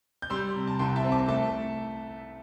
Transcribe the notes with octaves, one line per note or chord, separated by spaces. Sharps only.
G6
G3 C6 E6
C3
A5
C2 G5 C6
E5 A5
C4
A5 D6
A3 E5 A5